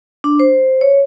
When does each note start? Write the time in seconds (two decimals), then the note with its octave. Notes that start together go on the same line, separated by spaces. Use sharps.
0.24 D4
0.39 C5
0.81 C#5